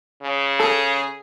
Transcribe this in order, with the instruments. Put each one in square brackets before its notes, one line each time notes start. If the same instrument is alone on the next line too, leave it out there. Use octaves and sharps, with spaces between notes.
[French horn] C#3
[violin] G#4 [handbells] A4 A5